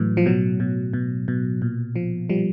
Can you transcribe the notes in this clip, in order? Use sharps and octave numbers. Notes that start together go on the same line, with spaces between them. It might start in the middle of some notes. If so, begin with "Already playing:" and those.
Already playing: A2 E3 F#3
F3
B2 F#3
B2
B2
B2
A#2
F3
F3 G3